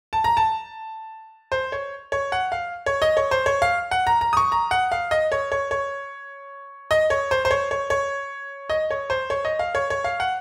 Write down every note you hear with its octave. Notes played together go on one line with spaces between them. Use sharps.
A5
A#5
A5
C5
C#5
C#5
F#5
F5
C#5
D#5
C#5
C5
C#5
F5
F#5
A#5
A#5
D#6
C#6
A#5
F#5
F5
D#5
C#5
C#5
C#5
D#5
C#5
C5
C5
C#5
C#5
C#5
D#5
C#5
C5
C#5
D#5
F5
C#5
C#5
F5
F#5